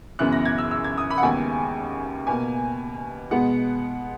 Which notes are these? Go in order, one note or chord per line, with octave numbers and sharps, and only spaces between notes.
F#2 C#3 E3 B3 F#6
A#6
G#6
E6
E6
G#6
D#6
B5
F#5
D#2 C#3 G#3 B3 G#5
B2 A#3 G#5
B2 G#3 B3 F#5